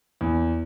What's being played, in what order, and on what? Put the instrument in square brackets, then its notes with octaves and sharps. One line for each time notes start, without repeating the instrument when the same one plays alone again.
[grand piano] E2